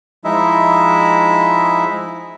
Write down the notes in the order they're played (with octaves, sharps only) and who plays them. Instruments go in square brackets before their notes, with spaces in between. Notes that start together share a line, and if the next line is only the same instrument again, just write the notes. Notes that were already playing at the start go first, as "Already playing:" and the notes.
[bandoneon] F3 G#3 D#4 E4 E5